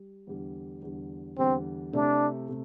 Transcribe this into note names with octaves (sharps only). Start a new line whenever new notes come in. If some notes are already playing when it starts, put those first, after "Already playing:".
Already playing: G3
E2 D3 G3
E2 D3 G3
E2 D3 G3 C4
C3 A3 D4 E4 G4
C3 A3